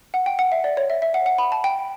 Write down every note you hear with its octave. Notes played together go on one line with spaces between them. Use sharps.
F#5
G5
F#5
E5
D5
C#5
E5
E5
F#5
F#5
B5
A5
G5